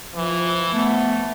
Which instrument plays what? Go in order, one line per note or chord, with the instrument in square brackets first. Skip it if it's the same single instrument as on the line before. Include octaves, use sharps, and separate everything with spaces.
[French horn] E3 [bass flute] F3
[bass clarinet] A3 [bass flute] B3